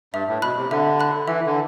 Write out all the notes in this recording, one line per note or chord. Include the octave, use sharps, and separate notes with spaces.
G2 E5
A2
B2 B5 F#6
C3
D3 E5
B5 F#6
E3 E5
D3